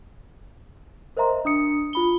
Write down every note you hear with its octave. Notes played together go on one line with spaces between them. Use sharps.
A#4 C5 D#5 E5 A#5 C6
D4 D#6 C#7
F4 B5 G7